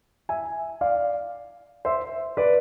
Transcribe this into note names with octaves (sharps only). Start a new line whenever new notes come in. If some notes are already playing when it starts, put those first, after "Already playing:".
E5 G#5
D5 F5
C5 E5
B4 D5